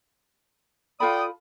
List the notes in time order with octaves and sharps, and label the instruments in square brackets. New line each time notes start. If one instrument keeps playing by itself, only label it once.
[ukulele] F4 A4 B5 [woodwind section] D5 G5 D#6